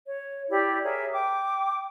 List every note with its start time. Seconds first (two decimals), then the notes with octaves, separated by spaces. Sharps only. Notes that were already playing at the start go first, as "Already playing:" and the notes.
0.06 C#5
0.50 E4 G4 D5
0.83 G#4 A#4 C#5 E5
1.12 G5 D6